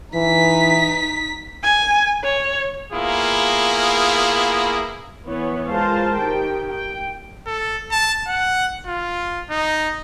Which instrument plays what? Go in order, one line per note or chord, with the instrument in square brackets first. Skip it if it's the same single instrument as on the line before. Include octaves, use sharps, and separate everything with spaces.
[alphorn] E3 [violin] D#4 B6
[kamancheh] G#5
C#5
[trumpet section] A#3 B3 E4 F4 G#4
[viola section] E3 B3 C#5
G#3 F4 A#4 C5 F5 A5
D#3 G4 G5
G5
[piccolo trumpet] A4
A5
F#5
F4
D#4